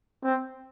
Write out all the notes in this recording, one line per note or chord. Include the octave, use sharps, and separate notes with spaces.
C4